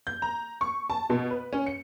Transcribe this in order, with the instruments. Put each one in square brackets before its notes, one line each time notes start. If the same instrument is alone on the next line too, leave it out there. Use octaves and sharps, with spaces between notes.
[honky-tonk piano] G6
A#5
C#6
A5
B2
B4
C#4
C#7